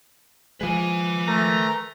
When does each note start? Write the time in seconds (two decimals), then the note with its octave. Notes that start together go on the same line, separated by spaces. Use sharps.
0.61 F3 G#3 B4 G#5
1.28 A3 A#4 A#5